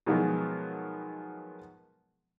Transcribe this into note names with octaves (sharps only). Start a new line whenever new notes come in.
B2 D#3 F3 F#3 G#3 B3